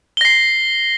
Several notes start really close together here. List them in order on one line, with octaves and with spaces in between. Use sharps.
G7 A#6 C7